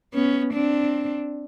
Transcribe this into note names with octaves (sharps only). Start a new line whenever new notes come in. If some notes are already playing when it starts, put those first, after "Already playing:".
B3 C#4
C4 D4